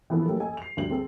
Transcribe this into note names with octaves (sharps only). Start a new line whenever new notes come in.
E3 F3 B3 E4 A4
F#3 A3 A#3 C#4 G4 A4
A4 D#5 G#5
C7 F7
D2 G3 F#7
C4 G#4 A4